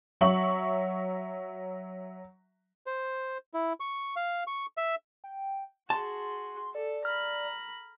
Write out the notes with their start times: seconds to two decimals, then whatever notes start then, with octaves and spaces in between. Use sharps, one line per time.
0.21 F#3 E5 C#6 F#7
2.87 C5
3.54 E4
3.80 C#6
4.16 F5
4.47 C#6
4.77 E5
5.24 G5
5.90 F#4 G#4 A5 C6
6.75 A4 D5
7.05 A#5 B5 F6